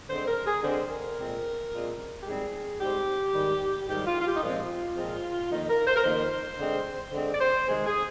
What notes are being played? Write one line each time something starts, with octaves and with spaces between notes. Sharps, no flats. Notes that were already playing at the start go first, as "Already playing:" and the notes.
D3 G#3 C4 C5
A#4
G#4
D3 G#3 C4 C5
A#4
A#2 G#3 C4
A#2 G#3 C4
G4
G#2 G3 C4 G#4
G#2 G3 C4 G4
G#2 D#3 G3
G#2 D#3 G3 G4
F4
F4
G4
D#4
A#2 F3 G#3 C4 F4
A#2 F3 G#3 C4
F2 D#3 A#3 D#4
A#4
C5
A#4
F2 D#3 A#3 C5
D3 G#3 C4
D3 G#3 C4
D5
C5
C3 D#3 G#3 C4 G#4
G#4